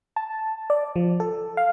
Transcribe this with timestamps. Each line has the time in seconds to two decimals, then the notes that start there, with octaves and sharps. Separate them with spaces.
0.16 A5
0.70 D5
0.96 F3
1.20 A4
1.57 F5